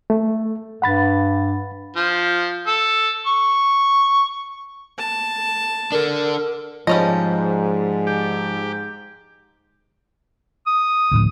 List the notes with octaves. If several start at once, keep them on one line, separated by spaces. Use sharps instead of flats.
A3
G2 F#5 B5 A6
F3
A4
C#6
A5
D4 A4 A#4
G#2 F3 G3 C#4 D#5
G4
D#6
D2 A2 F3